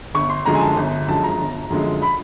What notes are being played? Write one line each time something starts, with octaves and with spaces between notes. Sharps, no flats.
G1 C#6
C6
F#2 D3 F3 G#3 A#5
G#5
A5
G1
F#2 D3 F3 G#3 A5
A#5
G1
F#2 D3 F3 G#3
B5